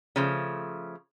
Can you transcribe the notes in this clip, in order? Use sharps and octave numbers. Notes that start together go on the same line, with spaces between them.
C#3 F3 A3